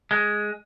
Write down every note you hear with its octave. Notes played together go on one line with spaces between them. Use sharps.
G#3